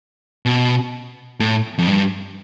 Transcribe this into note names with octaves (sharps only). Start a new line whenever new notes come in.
B2
A2
F2
G2